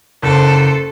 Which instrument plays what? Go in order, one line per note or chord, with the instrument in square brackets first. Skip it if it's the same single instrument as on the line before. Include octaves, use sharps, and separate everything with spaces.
[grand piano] F#1 [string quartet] A4 C5